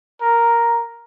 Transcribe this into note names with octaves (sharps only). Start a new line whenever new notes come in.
A#4